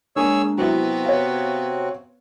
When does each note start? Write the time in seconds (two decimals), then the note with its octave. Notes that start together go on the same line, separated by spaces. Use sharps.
0.16 G#3 A#3 D4 G#4 C#5 E6
0.58 C3 F#3 B3 C4 E4 F#4
1.06 C#5 F5